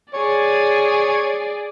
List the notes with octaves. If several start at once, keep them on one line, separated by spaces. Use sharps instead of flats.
G#4 C#5 D5